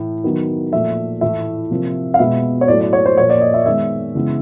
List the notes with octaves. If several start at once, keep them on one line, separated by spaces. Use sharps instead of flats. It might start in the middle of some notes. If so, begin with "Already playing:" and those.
Already playing: A2 E3 A3
D#3 F#3 B3
A#2 F3 A3 E5
A2 E3 A3 E5
C3 F3 A#3
F5
B2 G#3 B3 E5
C#5
A2 F#3 A3 D5
D5
C#5
C5
A#2 F3 A#3 C#5
D5
D#5
E5
D#3 G#3 B3 E5
C#3 E3 G#3 B3